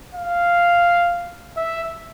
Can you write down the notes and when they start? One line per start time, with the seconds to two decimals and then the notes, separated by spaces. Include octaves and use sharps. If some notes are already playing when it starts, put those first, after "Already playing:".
0.14 F5
1.57 E5